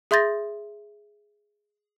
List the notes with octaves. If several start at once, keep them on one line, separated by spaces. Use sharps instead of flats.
G#4 E5 C6 G6 A6 A#6